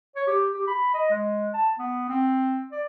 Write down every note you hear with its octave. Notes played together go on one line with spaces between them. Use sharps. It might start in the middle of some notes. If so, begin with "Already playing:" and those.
C#5
G4
G4
B5
D#5
G#3
A5
B3
C4
D5